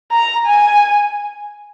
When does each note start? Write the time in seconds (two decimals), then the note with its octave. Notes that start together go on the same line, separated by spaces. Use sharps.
0.12 A#5
0.46 G#5